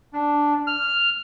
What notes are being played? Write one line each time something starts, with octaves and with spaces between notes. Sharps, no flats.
D4
F6